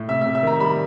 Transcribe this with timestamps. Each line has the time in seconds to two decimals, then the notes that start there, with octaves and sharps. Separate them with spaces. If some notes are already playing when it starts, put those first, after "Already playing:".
Already playing: A2
0.08 C3 E5
0.21 C3 E5
0.35 E5
0.43 D#3 A#5
0.60 G3 B5